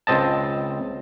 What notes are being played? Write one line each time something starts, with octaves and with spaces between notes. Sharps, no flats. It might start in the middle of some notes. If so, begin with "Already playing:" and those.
C#2 C4 D#5 A5